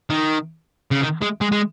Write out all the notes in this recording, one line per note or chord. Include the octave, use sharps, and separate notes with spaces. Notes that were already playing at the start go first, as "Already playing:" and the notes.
D#3
C#3
D#3
G#3
G#3
G#3